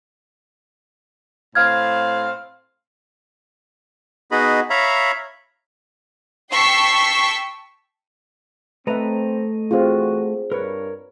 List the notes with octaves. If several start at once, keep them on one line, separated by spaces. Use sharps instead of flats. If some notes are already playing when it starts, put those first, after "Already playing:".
A2 C4 F5 F6 G#6
B3 D#4 F#4 G#4 D#5 B5
C#5 E5 F5 A#5 B5
G5 A5 C#6 E6 B6 C7
A3 C4 B4 D#5 E5 A#5
E3 C4 F4 F#4 G#4 C5
G2 A#4 B4 C#5